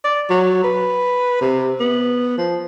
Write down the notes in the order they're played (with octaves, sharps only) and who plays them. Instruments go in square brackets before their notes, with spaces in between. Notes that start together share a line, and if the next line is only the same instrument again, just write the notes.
[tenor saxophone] D5
F#3
B4
C3
B3
F3